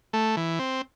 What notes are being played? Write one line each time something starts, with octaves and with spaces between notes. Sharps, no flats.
A3
E3
C4